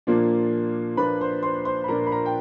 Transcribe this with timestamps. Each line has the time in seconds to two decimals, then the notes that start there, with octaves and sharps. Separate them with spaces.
0.07 A#2 F3 A#3 D4 F4
0.97 A#2 F3 A#3 D4 F4 B4 B5
1.21 C5 C6
1.43 C5 C6
1.65 C5 C6
1.84 B5
1.88 A#2 F3 A#3 D4 F4 A#4 A#5
2.07 B5
2.12 A#4 A#5
2.26 G5